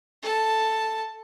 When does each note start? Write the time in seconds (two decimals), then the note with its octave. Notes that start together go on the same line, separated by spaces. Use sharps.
0.23 A4 A5